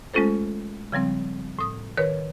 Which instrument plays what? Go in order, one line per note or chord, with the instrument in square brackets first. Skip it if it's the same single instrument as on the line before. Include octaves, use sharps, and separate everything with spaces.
[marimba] G#3 A3 C#4 F4 A4 C5
C#3 F3 G3 C4
A2 D#6
D#3 A#4 B4 C#5